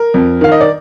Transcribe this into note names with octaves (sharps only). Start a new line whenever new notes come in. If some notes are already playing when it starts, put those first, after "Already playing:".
Already playing: A#4
F2
D#3 F5
D#5
D5